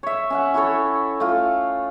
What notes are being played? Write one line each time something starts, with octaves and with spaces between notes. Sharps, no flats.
C#5 E5
C#4 E5 F#5
E4 F#4 A4 C#5
A3 F4